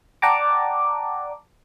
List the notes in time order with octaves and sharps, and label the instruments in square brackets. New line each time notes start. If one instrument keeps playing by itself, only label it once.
[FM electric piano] D5 F#5 G5 A5 A#5 D6